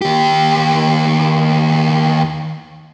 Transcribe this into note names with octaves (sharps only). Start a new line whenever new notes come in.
D#2 G4